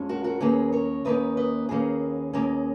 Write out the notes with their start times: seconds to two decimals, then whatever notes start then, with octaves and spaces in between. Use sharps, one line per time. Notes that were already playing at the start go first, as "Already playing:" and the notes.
Already playing: F2 G#3 C#4
0.09 F#4 A#4
0.24 F#4 A#4
0.40 D#2 D#3 A#3 C#4 G#4 B4
0.72 A#4 C#5
1.05 D#2 D#3 A#3 C#4 B4 D#5
1.37 B4 D#5
1.69 D#2 D#3 A#3 C#4 G#4 B4
2.33 D#2 D#3 A#3 C#4